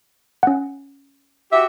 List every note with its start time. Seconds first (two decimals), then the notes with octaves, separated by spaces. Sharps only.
0.43 C#4 F#5
1.52 F#4 G4 E5